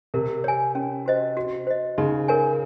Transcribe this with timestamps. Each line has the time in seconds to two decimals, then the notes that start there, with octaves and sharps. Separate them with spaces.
0.14 C3 A#4
0.44 C#5 G#5
0.75 C#4
1.06 F#4 C5 D#5
1.37 F#4
1.67 C5 D#5
1.98 C#3 D#4
2.28 A#4 C#5 G#5